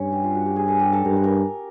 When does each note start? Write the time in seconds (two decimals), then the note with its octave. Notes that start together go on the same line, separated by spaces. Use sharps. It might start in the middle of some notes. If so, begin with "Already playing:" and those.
Already playing: G2 C#4
0.12 G4
0.24 F4
0.35 F#4
0.46 G4
0.56 G#4
0.68 A4
0.80 G4
0.93 A4
1.05 G2 A#4
1.16 B4
1.24 A#4